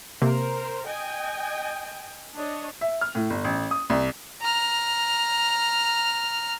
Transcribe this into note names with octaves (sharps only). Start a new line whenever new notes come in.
C3 A#3 A#4 C5
D#5 G5 G#5
D4 C#5 D#5
E5
F6
A2
G1
A1
D#6
C2
A#5 F6